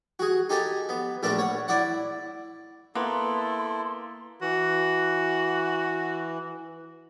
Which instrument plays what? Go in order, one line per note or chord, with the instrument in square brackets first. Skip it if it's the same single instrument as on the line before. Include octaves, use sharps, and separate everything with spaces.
[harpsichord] F#4 G#4
D#4 G4 A4 G#5 A#5
B3
A#1 A3 D4 A#4 B4
C#5 F#5
E4 D5 E5 F#5
[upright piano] A#3 [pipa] B3 [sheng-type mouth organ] E4 A4 [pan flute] C6
[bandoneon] E3 [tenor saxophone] F#4